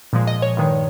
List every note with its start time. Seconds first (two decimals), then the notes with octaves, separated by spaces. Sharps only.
0.13 A#2 F3 G#3
0.27 D#5
0.42 C#5
0.57 G2 D#3 G#3